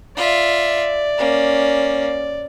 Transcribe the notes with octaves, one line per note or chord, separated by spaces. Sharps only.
F4 D5 E5
A#3 C#4